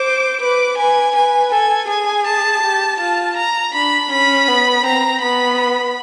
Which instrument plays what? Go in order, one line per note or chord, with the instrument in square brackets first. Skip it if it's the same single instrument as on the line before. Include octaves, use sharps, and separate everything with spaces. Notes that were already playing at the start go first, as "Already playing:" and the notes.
Already playing: [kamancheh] C5 [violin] D6
[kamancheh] B4 [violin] D6
[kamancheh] B4 [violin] G#5
[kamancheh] B4 [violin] G#5
[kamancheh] A4 [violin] G#5
[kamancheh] G#4 [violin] G#5
[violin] A5
[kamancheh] G4
[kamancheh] F4 [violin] A5
[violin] A#5
[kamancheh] D4 [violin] B5
[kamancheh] C#4 [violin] B5
[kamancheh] B3
[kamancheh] C4 [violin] A#5
[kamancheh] B3 [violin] B5